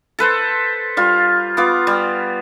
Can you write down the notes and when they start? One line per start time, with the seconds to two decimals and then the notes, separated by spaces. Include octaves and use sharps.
0.19 A4 B4 C5
0.97 G3 F4
1.57 B3 F4 D6
1.87 G3